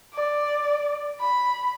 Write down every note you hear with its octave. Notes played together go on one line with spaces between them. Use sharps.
D5
B5